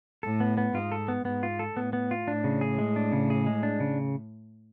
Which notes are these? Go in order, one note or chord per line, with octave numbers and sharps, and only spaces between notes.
A2 A4
B3
B3
G#2 F4
A4
B3
G#2 B3
F4
A4
A2 B3
B3
F4
A2 D4
C#3
G#4
G#3
D4
C#3
G#4
G#3
D4
C#3